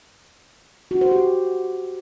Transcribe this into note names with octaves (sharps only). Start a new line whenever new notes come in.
F#4
C5
G4